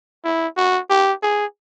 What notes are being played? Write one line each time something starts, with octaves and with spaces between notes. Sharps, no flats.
E4
F#4
G4
G#4